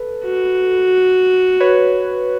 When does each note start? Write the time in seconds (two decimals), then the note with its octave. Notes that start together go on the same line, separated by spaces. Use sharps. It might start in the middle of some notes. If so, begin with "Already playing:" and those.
Already playing: A4 B4
0.25 F#4
1.60 B4 C#5